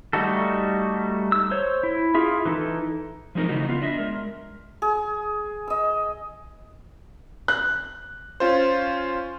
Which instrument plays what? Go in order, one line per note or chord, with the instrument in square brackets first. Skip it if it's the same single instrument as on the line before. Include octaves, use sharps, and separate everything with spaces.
[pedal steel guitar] G3 A3 D#4 F#4 A4
E6
C5 C#5
E4
E4 F4 G#4 E5
E3 D#4 A4
[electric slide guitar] F3 F#3 G#3 C4 D#4 A#4
C#3 E3 A3 D#4 F#4
B3 F4
D4 D#5 E5
G#3 A#4
[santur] G#4
D#5 E6
[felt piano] F#6
[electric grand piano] C#4 F4 C5